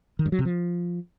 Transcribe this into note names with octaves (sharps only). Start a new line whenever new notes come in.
D#3
G2
F#3
C3
F3